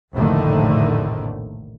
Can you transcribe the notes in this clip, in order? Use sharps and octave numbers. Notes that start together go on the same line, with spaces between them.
F1 A#1 A2 D3 D#3 A3